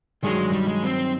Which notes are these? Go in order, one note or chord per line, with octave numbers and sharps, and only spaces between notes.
G2 D#3 F#3 G#3
G3
G#3
C4